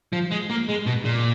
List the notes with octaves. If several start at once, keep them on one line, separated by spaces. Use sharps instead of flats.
F3
G#3
A#3
G#3
B2
A#2